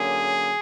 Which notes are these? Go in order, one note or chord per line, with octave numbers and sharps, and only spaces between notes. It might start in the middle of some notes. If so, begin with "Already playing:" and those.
Already playing: D3 F#3 A#3 C#4 G#4